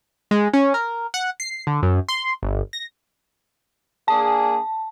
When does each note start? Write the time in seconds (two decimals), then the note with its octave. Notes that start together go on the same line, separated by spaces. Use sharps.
0.31 G#3
0.53 C#4
0.74 A#4
1.14 F#5
1.40 C7
1.67 D3
1.83 F#2
2.09 C6
2.43 G1
2.73 A#6
4.08 A#3 D4 G#4 A5